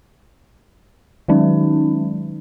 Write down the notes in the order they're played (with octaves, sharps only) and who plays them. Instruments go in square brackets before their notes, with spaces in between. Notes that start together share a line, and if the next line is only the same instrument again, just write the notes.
[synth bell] D#3 F#3 G#3 C#4 D#4